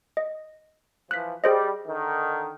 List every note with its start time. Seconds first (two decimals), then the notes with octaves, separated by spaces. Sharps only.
0.17 D#5
1.11 E3 F3 F#6 B6
1.44 G3 G#4 C5 D#5
1.86 D3 D#3